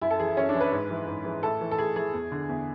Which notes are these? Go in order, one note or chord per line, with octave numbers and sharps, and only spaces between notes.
F#2 E4
A4
E3 G#4
E4
F#2 C#4
D4
E3
B4
G#2
E3
G#2
E3
A2 A4
E3
A4
A2 G#4
E3 G#4
E2
D3
E2